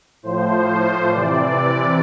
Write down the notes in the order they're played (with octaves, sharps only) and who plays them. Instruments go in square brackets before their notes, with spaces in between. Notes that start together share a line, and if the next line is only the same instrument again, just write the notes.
[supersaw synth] A2 F3 C5
C3 E3 D5